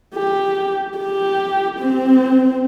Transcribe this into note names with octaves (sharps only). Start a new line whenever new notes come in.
G4
G4
C4